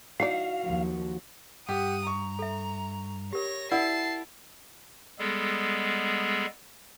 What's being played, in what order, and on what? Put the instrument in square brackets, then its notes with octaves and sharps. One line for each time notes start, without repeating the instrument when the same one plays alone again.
[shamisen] E3 D#4 D5 [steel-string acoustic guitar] F#4 [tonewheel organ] F5
[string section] D#2 F3 F#3
[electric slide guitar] G2 [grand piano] G4 [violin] F#5 D#6
[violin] A#5 [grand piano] C#6
[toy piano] A4 E5
[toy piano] G4 A#4 [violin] C#5 A#6
[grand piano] E4 [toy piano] A#4 D5 F#5 [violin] A5 C7
[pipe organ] G3 G#3 B3 G#4 A4